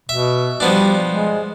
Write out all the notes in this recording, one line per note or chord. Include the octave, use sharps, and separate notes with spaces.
B2 E5
F3 G3 B3 D4
G#3